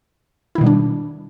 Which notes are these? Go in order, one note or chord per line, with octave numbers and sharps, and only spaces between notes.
B2 D#3 G3 D4 E4